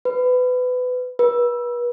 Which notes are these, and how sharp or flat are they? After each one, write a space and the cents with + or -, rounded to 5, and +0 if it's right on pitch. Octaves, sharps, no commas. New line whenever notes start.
B4 +25
B4 -35